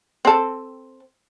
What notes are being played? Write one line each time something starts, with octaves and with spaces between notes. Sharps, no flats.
C4 A4